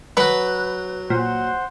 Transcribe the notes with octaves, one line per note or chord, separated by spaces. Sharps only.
F#3 F#4 B4
A#2 C5 F#5